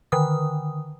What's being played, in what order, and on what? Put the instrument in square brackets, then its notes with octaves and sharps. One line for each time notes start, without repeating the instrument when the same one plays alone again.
[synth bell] D3 D#3 D#6